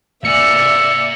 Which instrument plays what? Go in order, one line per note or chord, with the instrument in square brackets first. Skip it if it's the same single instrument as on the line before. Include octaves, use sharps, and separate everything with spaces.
[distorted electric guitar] A#3 G#5 [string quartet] D5 E5 [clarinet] E6 [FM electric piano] C#7